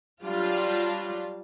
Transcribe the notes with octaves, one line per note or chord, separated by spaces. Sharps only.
F#3 G3 D4 F4